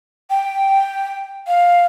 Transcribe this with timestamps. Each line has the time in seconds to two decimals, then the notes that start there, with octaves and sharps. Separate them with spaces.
0.30 G5
1.47 F5